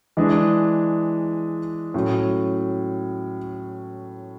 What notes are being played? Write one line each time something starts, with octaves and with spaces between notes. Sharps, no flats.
E3 G#3 D4 G#4
A2 F#3 C#4